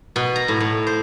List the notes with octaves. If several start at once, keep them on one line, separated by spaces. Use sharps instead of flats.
B2
A#5
A2
A2
C5